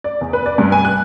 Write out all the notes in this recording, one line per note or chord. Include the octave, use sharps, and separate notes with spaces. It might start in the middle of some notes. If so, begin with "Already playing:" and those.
D5
E2
B4
D5
G2
G#5
F#6